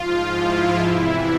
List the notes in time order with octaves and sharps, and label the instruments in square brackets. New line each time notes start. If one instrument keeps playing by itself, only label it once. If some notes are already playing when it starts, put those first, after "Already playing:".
Already playing: [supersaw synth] G#2 F3 F4
E4
E2 C3 E3